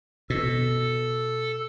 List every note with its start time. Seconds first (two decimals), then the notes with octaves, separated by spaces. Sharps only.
0.30 B2 A4